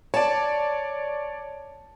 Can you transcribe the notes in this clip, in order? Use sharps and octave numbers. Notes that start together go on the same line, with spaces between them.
C#5 D5 A5